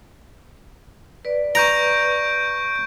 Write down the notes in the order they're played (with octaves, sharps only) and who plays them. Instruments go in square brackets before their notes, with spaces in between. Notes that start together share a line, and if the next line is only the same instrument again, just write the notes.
[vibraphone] B4 D5
[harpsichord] A#5 [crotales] C#6 G6 D7